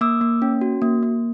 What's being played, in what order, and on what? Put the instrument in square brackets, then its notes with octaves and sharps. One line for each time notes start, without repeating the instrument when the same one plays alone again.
[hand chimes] A#3 D6 E6
A#3
C#4
F#4
A#3
A#3